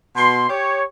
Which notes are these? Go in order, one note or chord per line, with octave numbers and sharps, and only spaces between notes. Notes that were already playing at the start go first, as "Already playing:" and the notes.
B2 C6
G4 C#5